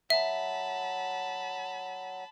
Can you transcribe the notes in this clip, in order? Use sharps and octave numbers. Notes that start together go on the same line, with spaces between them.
F#3 E5 A5 B5